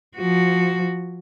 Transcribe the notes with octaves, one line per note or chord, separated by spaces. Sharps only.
F3 F#4